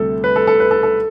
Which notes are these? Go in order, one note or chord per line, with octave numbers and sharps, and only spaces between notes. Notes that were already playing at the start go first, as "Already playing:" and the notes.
Already playing: D2 C3 G3 A4
B4
A4
A4
B4
A4
A4